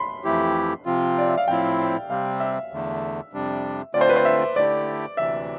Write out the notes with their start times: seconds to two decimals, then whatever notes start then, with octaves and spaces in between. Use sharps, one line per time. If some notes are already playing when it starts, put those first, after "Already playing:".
Already playing: B5 C6
0.24 F2 E3 A3 E4 G4
0.86 C3 F3 C4 F4
1.18 D5
1.28 E5
1.37 F5
1.48 A2 F3 C4 E4 G5
2.09 C3 G3 C4 F5
2.40 E5
2.71 E2 D3 A3
3.33 F2 C3 G3 D4
3.94 D3 A3 C4 F4 D5
4.01 C5
4.09 B4
4.16 C5
4.25 E5
4.56 D3 A3 E4 G4 D5
5.17 D2 C3 E3 E5